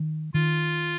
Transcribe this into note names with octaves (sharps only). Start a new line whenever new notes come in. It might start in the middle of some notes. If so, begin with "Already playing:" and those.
Already playing: D#3
D#3 F4